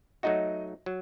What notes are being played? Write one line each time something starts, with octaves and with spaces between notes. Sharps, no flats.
F#3 A3 D#4 F#4 D#5
F#3